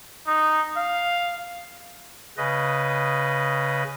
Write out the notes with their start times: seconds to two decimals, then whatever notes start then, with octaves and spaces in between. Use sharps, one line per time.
0.27 D#4
0.77 F5
2.37 C#3 B4 D#5